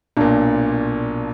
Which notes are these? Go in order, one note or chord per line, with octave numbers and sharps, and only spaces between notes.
B1 A#2 D4